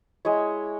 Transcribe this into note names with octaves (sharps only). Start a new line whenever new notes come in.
G#3 E4 C#5